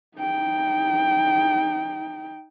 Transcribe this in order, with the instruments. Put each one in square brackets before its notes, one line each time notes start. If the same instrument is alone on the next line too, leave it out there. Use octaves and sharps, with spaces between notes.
[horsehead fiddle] D#4 G5